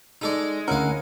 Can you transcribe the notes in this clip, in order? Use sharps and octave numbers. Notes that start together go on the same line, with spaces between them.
G#3 D#4 A4 D5
D2 C#4 E4 A#4 F5 F#5